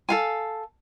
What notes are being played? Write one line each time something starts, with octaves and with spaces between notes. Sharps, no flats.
A4 F5 G#5